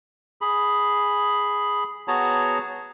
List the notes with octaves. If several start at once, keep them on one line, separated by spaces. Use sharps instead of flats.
G#4 B5
B3 F#4 G#4 C#5 A5 A#5